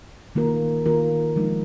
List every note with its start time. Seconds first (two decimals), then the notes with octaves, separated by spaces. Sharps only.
0.35 D#3 A#3 F4 A#4
0.86 D#3 A#3 F4 A#4
1.36 F3 G#3 D#4